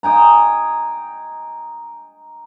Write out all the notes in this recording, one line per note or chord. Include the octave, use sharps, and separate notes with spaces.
D#5 G5 G#5 A#5